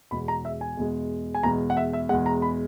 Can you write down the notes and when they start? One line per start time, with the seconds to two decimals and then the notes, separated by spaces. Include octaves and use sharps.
0.11 E2 B2 G#3 B5
0.28 A#5
0.45 E5
0.61 G#5
0.77 E2 B2 G#3
1.34 G#5
1.43 E2 B2 G#3 A#5
1.70 F#5
1.77 E5
1.93 E5
2.09 E2 B2 G#3 F#5
2.26 A#5
2.42 B5